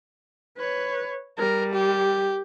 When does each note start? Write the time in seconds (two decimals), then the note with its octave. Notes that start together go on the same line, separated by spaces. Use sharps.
0.57 B4 C#5
1.38 G3 A#4
1.74 G4